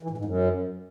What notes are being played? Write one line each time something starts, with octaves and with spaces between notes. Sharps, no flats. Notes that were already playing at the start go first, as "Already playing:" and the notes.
E3
A2
G#2
F#2